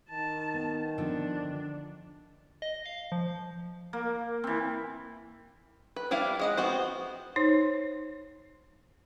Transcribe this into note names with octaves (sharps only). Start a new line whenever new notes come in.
D#3 A5
B3
D3 F3 B3 D4
D#5
F5
F3
A#3
E3 C4
B4
G3 D4 E4 F5
G#3 D#5 F#5
B3 C4 F#4 C5
D#4 C5 C#5